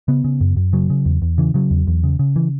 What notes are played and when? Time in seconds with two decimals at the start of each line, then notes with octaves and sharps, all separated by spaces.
0.08 C#3 B3
0.24 C#3
0.41 F#2
0.56 F#2
0.73 C#3 F#3
0.90 C#3
1.05 E2
1.22 E2
1.38 C#3 E3
1.54 C#3 F#3
1.71 E2
1.87 E2
2.04 C#3
2.19 C#3
2.36 E3